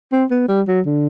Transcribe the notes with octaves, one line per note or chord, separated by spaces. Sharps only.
C4
B3
G3
F#3
D3